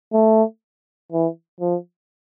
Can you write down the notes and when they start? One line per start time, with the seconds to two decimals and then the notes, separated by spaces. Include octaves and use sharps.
0.13 A3
1.12 E3
1.61 F3